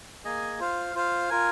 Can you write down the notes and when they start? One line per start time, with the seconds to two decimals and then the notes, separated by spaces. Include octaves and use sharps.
0.25 A#3 G#4 D#5 G#5
0.60 F4 C5 F5
0.95 F4 C5 F5
1.30 F4 A#4 G#5